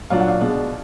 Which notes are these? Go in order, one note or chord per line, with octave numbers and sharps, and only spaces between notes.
A#2 F#3 D4 F5
F#5
F5
B2 G#3 D4